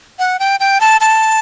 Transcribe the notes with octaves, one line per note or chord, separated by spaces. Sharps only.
F#5
G5
G5
A5
A5